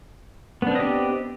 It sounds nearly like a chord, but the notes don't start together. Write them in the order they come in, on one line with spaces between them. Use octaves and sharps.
B3 D4 C4 D#5 G4